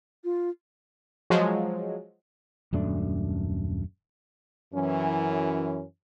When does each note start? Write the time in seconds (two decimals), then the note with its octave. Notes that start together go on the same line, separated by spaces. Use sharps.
0.24 F4
1.30 F3 F#3 G#3
2.73 D#1 F#2 A3 D4
4.74 F#2 E3 C#4